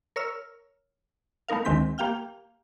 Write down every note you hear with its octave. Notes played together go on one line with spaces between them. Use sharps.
A#4 C#5 E6 F6
A3 B3 D#4 A#4 F5
D2 D#3 G#3 C4 G6 B6
A#3 G4 F5 G5 F6